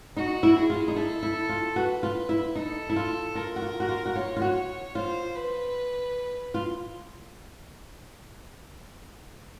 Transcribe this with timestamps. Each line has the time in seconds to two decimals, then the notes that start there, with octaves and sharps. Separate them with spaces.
0.17 D#4 F#4
0.43 E4
0.57 G#4
0.70 F4
0.88 D#4
0.96 E4 A4
1.23 E4
1.49 F4
1.76 F#4 B4
2.03 F4
2.29 E4
2.55 D#4 A4
2.89 E4
2.96 F4
3.35 F4 A#4
3.56 F#4
3.62 F4
3.80 F#4
3.89 F4
4.06 F#4
4.15 F4 C#5
4.36 F4
4.42 F#4
4.95 F4 C5
5.36 B4
6.54 F4